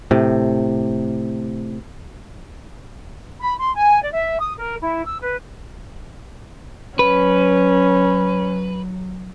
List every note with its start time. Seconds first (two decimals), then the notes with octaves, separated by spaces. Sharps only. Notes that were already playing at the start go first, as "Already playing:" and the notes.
0.11 A2 C3
3.41 B5
3.59 C6
3.75 G#5
4.02 D5
4.13 E5
4.40 D#6
4.58 A#4
4.80 E4
5.05 E6
5.20 B4
6.99 F#3 C#4 B4